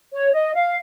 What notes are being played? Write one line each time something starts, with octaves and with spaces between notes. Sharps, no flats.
C#5
D#5
F5